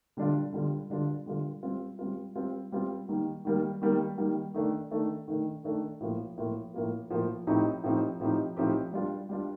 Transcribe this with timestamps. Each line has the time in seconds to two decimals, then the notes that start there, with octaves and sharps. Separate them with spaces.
0.17 D3 G3 D4 F4
0.52 D3 G3 D4 F4
0.90 D3 G3 D4 F4
1.26 D3 G3 D4 F4
1.63 G3 C4 F4
1.99 G3 C4 F4
2.35 G3 C4 F4
2.72 G3 C4 F4
3.08 D#3 G3 A#3
3.45 D#3 G3 A#3
3.82 D#3 G3 A#3
4.18 D#3 G3 A#3
4.54 D#3 A3 D4
4.91 D#3 A3 D4
5.28 D#3 A3 D4
5.64 D#3 A3 D4
6.01 A2 F3 A#3 F4
6.38 A2 F3 A#3 F4
6.74 A2 F3 A#3 F4
7.10 A2 F3 A#3 F4
7.47 A2 F3 C4 D#4 G4
7.83 A2 F3 C4 D#4 G4
8.20 A2 F3 C4 D#4 G4
8.57 A2 F3 C4 D#4 G4
8.93 G3 D4 F4
9.29 G3 D4 F4